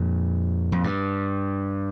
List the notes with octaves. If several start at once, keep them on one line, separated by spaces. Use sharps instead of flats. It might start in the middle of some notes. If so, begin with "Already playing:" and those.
Already playing: F2 A#2
F2
G2